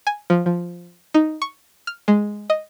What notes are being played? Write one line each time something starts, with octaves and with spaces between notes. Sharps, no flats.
G#5
F3
F3
D#4
C#6
F6
G#3
D#5